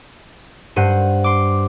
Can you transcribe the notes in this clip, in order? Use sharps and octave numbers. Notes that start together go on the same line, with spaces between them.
G2 C5 F#5 D#7
C6 D6